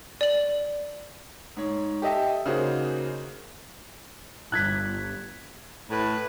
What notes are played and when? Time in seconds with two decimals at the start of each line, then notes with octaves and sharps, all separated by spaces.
0.21 D5 F#7
1.57 G#2 C#5
2.02 G4 A4 D#5 E5 G5
2.46 C#3 A#3 D#4 F#4 G#4 C5
4.52 G1 F#6 G#6 B6
5.90 A2 B4